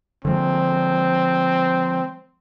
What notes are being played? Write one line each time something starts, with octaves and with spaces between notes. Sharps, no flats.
D3 F3 G#3 C4